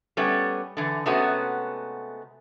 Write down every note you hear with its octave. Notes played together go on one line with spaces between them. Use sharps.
G3 A3 B3 C#4
D3 E3
C3 G#3 A3 B3 C#4 F#4